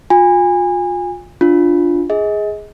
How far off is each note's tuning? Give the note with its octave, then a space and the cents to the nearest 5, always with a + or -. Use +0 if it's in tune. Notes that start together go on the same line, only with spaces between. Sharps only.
F4 +35 G#5 -30
D4 +0 F4 +0
G#4 +0 D#5 +35